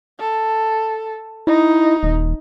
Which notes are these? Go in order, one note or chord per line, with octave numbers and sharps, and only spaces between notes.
A4
D#4 E4
D#1